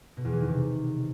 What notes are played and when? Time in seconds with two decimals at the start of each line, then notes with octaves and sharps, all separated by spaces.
0.17 B2
0.25 E2
0.33 E3
0.40 D#3
0.48 C3